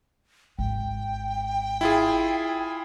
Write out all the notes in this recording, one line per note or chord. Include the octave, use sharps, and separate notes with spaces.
G#1 G5
E4 F4 G#4